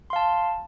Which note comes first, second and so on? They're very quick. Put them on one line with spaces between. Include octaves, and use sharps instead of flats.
C6 F5 A5